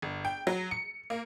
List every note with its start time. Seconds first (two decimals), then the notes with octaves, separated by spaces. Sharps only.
0.02 G1
0.25 G5
0.47 F#3
0.71 C#7
1.10 A#3